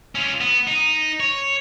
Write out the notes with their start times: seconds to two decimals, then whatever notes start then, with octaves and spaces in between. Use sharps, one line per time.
0.15 C#4 F4
0.41 B3
0.67 D#4
1.20 C#5